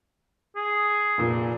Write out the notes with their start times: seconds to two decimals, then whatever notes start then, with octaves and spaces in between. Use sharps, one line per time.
0.56 G#4
1.18 F1 A#2